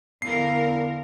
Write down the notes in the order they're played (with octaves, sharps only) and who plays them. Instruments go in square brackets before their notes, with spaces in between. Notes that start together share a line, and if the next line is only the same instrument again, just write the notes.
[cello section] E2 D3 A#4 [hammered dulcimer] F3 [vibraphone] B3 E4 [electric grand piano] C7